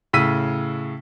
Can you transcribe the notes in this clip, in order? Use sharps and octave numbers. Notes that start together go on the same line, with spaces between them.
A2 C#3 E6 B6 D#7